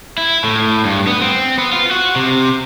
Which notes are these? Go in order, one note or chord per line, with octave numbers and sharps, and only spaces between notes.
E4
A2
G2
B3
C4
B3
F4
F#4
C3